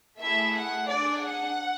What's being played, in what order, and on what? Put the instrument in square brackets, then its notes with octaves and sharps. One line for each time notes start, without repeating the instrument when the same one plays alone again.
[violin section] A3 E4 G#4 E5
F#5
D4 G#4 D5
F#5